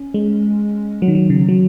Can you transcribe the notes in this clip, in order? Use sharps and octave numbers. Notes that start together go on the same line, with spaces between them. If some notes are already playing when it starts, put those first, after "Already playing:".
Already playing: C#4
G#3
F#3
D#3
F#3
C#3
F#3